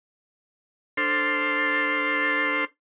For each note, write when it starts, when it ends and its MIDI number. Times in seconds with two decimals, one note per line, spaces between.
0.97 2.65 62
0.97 2.65 69
0.97 2.65 72
0.97 2.65 84
0.97 2.65 89